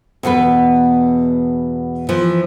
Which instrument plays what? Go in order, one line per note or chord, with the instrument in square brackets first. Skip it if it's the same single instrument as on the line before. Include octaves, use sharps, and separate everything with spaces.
[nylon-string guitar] E2 B2 B3 B4
E3 F3